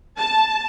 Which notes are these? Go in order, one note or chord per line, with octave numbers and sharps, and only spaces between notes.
A5